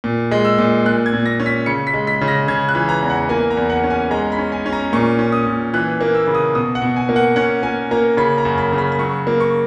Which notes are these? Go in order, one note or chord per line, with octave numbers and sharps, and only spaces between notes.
A#2
G#3
E6
A#2
A#2 F#6
G#6
A#2
A#6
C#4
B6
C#3 C#7
B6
G#3
B6
C#3
A#6
C#3 G#6
F#6
E3
A#5
E2
F#5
A#3 G#5
A#5
E2
F#5
C#4
G#5
G#3 A#5
B5
C#4
G#5
C#4
A#5
A#2 C#6
C#4
D#6
A#2
E3 F#6
A#3
E6
C#3
D#6
B2 D#6
F#5
B2
G#5
A#3
F#5
C#4 F#5
A#3 G#5
A#3 A#5
C#3 B5
A#5
F#2
B5
C#3
B5
B5
F#3 C#6
A#3
C#6